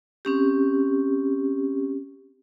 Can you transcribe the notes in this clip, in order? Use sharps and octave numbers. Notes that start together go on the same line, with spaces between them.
C4 C#4 G4